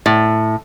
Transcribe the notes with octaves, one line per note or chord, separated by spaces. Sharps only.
A2